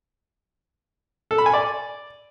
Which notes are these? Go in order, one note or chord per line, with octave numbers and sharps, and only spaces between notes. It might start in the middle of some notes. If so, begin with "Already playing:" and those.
A4
B5
G#5
D5